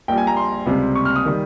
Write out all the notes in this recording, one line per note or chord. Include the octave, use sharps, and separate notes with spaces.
A#1 A#2 G3 G5
G#5
A#5
C6
C#2 C3 G3
C#6
F6
D#6
D#3 G3